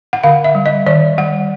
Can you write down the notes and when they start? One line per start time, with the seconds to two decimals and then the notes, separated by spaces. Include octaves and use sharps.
0.13 F#5
0.23 D3 F5
0.44 E5
0.55 G3
0.66 D#5
0.86 D#3 D5
1.18 G3 F#5